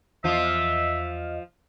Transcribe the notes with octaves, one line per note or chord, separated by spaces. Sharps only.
E2 F3 F4 D#5 E5 F6